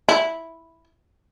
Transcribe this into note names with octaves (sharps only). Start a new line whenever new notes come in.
E4